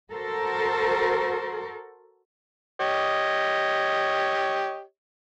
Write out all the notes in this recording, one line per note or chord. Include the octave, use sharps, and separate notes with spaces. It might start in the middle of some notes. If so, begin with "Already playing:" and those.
F#4 A4 A#4 C5
G4 C#5 D#5